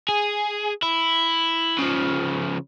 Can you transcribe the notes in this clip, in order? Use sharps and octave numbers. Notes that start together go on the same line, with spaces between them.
G#4
E4
C#3 F3